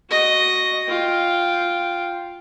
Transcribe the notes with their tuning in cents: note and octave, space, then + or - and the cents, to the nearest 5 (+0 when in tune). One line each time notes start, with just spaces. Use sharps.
F#4 +0 D#5 +0
F4 +0 G5 +0